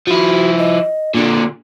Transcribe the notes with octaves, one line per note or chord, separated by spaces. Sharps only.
F3 E4 F#4
D#5
A#2 D3 D4